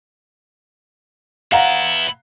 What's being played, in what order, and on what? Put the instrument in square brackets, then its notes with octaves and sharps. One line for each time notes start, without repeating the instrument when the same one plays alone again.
[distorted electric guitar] B3 E4 [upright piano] F5 F#5 A#5